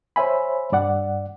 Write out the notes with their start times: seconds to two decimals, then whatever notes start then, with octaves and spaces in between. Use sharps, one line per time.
0.16 C5 C#5 E5 G#5 B5
0.72 G2 D5 F#5